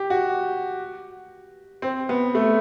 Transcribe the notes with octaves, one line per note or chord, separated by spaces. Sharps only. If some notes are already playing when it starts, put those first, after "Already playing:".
Already playing: G4
F#4
C4
B3
A3